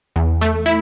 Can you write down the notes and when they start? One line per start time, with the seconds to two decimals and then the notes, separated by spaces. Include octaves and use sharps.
0.16 E2
0.41 A3
0.66 E4